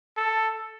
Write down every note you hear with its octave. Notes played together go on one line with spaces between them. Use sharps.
A4